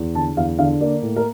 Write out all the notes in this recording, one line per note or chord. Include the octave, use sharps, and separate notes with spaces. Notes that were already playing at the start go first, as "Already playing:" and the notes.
Already playing: E2
D3 A5
E2 F5
D3 F5
A#3 D5
A2
A#4